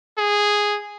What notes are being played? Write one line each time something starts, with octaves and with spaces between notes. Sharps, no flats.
G#4